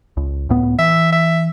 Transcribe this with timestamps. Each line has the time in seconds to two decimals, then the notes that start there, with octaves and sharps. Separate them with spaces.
0.17 C#2
0.49 C#2 A2 B3
0.79 E3 E5
1.12 E5